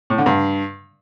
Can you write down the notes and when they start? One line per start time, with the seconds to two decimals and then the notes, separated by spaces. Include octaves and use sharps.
0.10 A2
0.18 D3
0.26 G2